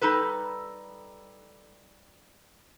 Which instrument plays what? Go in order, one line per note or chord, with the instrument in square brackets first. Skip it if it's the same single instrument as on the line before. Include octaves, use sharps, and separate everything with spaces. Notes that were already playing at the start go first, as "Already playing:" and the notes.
[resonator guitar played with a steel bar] G3 D#4 A4 B4